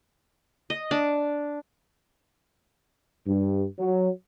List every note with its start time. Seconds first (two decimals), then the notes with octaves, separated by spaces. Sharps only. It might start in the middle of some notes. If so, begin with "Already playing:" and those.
0.70 D#5
0.91 D4
3.27 G2
3.78 F#3